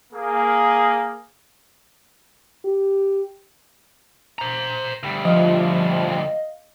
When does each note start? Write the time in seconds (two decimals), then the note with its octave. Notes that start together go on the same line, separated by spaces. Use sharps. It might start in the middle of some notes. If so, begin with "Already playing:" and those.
0.13 A#3 G#4
2.65 G4
4.39 C5 A#5
5.03 D2 G3
5.25 F3 D#5 F5